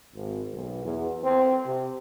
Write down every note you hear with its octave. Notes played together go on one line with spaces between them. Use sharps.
G#1
B1
E2
C4
C3